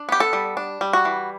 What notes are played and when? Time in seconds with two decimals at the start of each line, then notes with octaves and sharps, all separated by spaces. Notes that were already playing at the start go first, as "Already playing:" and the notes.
Already playing: D4
0.09 B3 G4
0.20 A4
0.33 G3
0.57 D4
0.81 G3
0.93 F#4
1.05 E3